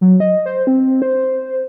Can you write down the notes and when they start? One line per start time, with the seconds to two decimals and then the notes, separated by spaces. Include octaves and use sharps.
0.01 F#3
0.20 D#5
0.46 C5
0.67 C4
1.02 C5